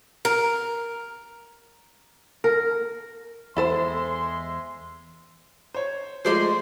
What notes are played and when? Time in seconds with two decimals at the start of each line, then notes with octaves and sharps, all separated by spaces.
0.25 A#4
2.44 A#4
3.57 E2 G#3 E4 A4 C5 E5 C6
5.75 C5 C#5
6.25 F3 G#3 A3 C5 D5 C6